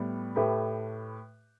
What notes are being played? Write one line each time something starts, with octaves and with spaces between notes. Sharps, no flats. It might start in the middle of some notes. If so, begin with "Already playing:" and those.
Already playing: A2 G3 B3
A2 A3 G4 B4